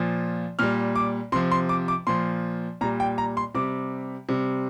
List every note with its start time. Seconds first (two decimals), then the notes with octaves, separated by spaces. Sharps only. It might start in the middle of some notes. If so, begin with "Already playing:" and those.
Already playing: A#2 F3
0.59 A#2 G3 F6
0.95 D6
1.32 C3 C6
1.36 F3
1.52 C6
1.69 D6
1.88 D6
2.07 A#2 F3 C6
2.81 A#2 A#5
2.84 G3
3.00 G5
3.18 A#5
3.37 C6
3.55 C3 G3 D6
4.29 C3 G3